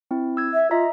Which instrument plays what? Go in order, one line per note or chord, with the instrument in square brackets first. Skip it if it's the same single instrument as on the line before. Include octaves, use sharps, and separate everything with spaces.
[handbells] C4 E4
E6 G#6
[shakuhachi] E5
[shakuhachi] F4 [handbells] D#5 E5 A#5